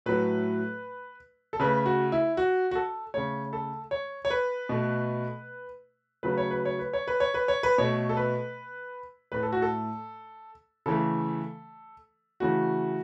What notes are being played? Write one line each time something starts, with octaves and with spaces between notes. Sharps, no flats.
A2 F#3 A3 B4
A4
C#3 A3 B4
F#4
E4
F#4
F#4
A4
C#3 A3 C#5
A4
C#5
C#5
B4
B2 A3
C#3 F#3 A3 B4
C#5
B4
C#5
B4
C#5
B4
C#5
B4
C#5
B4
B2 A3 C#5
A4
B4
A2 A3 B4
A4
F#4
A4
C#3 E3 A3 A4
C#3 E3 A3 F#4